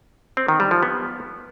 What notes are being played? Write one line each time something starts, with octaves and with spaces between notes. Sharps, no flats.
C4
D#3
G3
F3
B3